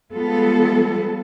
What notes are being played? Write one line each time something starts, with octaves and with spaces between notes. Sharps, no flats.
F3 G3 G#3 B3 F4 A4